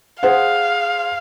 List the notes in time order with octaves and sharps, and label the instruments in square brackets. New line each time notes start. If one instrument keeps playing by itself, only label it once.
[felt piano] G#4 C5 F#5 [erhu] F5